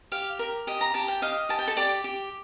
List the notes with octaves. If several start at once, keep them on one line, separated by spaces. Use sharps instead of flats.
G4 F5
A#4
G4 D#5
A#5
G4 A5
G5
D#5 F5
G4 A5
G5
A4 A5
G4 D5 D6
G4